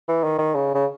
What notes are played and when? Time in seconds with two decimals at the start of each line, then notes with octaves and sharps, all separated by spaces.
0.08 E3
0.24 D#3
0.39 D#3
0.55 C#3
0.75 C#3